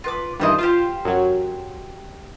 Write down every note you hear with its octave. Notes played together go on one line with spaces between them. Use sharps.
F4 B4 D6
G2 D#3 E3 F4 C5 D#5
F4 G4 C5 F5
F#2 F#3